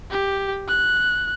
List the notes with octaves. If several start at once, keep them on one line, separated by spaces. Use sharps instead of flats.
G4
F#6